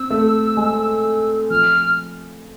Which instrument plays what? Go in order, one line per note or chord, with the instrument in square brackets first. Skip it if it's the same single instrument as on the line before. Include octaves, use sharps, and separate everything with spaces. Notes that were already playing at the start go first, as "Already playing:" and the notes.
Already playing: [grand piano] C4 [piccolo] E6
[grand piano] A3
G#3
[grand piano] F3 [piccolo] F6